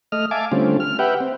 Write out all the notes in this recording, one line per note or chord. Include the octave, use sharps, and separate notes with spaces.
A3 D#5 F6
E5 F5 G#5 A5 D6
D3 G3 A3 C4 C#4 F4
F6
G4 B4 E5 F#5 G5
C4